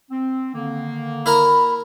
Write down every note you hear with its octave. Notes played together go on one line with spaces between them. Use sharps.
C4
D3 D#3 A#3
E4 A#4 A#5 B5